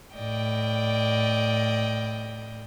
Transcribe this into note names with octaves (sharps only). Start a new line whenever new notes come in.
A2 D5 D#5 G5